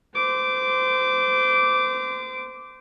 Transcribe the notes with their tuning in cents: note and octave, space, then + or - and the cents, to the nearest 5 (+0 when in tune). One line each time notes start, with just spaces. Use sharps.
C5 -30 D6 -5